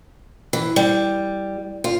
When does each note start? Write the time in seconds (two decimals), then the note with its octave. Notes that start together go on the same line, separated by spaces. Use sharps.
0.53 E3
0.76 G3
1.84 F4